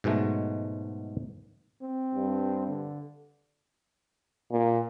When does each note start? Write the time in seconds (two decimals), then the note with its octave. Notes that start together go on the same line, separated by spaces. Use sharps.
0.04 G#2 B2 F#3 G#3 A3
1.82 C4
2.15 G2
2.67 D3
4.51 A#2